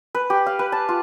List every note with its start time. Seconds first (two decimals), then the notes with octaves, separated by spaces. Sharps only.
0.15 B4
0.30 G4
0.46 F5
0.59 B4
0.72 A5
0.89 F4